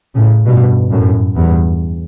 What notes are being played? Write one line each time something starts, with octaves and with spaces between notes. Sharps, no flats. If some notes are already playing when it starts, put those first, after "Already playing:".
A2 C#3
G2 B2
F#2 A2
E2 G2